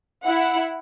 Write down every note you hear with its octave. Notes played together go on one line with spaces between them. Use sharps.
E4 F#5